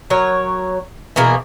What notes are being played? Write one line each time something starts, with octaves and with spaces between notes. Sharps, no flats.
F#3 A#4 C#5
B2 E3 A#3 G#4